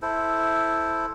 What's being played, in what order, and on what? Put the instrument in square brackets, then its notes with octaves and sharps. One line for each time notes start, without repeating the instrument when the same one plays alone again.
[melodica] E4 A4 C5